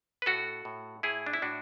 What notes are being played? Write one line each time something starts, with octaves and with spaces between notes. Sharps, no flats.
B4
A2 F#4 A4
A2
A2 E4 G#4
D4
E4
A2 D4 F#4